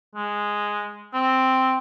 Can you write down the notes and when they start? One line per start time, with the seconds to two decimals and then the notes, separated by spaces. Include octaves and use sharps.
0.15 G#3
1.14 C4